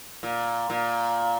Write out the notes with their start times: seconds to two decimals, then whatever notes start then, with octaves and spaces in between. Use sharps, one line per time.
0.23 A#2
0.70 A#2